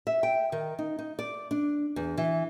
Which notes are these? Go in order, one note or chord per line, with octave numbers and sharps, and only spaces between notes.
E5
G5
D#3
D#4
D#4
D5
D4
E2
E3